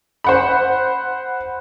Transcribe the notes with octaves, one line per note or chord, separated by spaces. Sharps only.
C5 F#5 B5